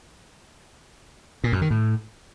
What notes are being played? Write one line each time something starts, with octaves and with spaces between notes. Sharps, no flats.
A#2
F#2
D#3
A2